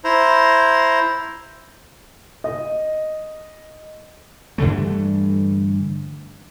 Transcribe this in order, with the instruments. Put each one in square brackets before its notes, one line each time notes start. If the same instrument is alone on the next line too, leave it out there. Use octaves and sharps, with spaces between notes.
[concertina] E4 C5 A#5
[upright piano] D#5
[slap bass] G2 D3 E3 A3